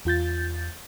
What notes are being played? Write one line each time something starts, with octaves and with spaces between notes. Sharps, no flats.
E2 F4 G6 A6